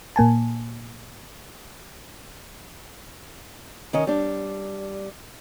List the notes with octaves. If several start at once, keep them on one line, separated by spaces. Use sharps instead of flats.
A#2 A#3 G#5 A5
D#3 C#4 D#5
G3 D4